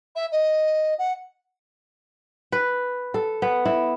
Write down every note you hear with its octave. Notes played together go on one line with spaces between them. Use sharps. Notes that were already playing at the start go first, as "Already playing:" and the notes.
E5
D#5
F#5
B4
A4
B3
E4